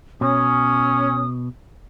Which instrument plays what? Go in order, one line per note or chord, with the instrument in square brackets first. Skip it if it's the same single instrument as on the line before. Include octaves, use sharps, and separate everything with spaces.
[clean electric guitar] B2 [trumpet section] C#4 [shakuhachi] D#6